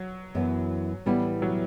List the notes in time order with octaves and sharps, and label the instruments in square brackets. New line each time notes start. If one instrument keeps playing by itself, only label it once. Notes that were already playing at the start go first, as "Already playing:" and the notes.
Already playing: [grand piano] F#3
[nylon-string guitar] F#2 E3 B3 E4
[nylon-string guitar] A2 E3 B3 E4 [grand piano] G3
[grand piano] F#3